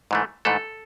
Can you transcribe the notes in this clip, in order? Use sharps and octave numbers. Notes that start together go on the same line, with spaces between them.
G#2 E3 A3
G#2 E3 A3 A4